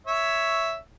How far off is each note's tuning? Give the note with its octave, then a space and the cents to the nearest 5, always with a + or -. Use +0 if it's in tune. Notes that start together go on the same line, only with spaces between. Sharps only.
C#5 +5 E5 +0